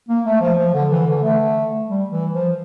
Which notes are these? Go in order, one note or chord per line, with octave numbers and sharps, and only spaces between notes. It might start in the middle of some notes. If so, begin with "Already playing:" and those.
A#3
A3
F3
F3
D3
E3
D3
A3
G3
E3
F3